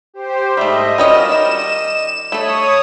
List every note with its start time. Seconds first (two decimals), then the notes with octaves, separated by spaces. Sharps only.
0.14 G4 C5
0.57 G#2 G3 A3 D#5 E5
0.98 G3 C#4 F4 F#4 A#4 D#5 E7
1.31 D#3 G3 D#5
2.32 A3 A4 C#5 B5 D#6